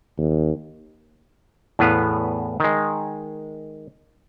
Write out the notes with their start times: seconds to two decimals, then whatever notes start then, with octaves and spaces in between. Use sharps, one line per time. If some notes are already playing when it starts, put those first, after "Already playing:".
0.18 D#2
1.79 E2 A2 B3 B4 F5
2.60 D#3 G#3